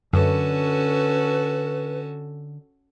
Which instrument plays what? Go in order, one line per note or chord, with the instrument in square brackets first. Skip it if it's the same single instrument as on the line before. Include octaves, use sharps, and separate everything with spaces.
[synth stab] F#2 [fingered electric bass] D3 [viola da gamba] C#4 F#4 A4 [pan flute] B4